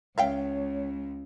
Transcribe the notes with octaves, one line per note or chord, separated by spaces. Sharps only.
C#2 C#5 E5 F5 G5